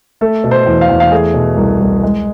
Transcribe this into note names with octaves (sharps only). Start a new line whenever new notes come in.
A3 A4
B2
C5
E2
F5
E2
F5
A3 G#4
B2
C2
C2
G#3